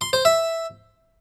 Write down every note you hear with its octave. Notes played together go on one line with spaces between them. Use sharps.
C6
C5
E5